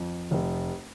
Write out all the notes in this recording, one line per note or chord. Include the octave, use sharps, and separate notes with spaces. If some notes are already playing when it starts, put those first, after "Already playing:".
Already playing: F2
F1